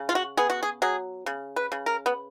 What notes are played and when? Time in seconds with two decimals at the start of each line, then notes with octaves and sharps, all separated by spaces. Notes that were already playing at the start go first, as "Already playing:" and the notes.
Already playing: C#3
0.09 F4
0.15 F#4
0.37 B3 G#4
0.50 F#4
0.63 G#4
0.82 F#3 G#4
1.26 C#3
1.56 B4
1.72 C#3
1.86 A#4
2.06 B3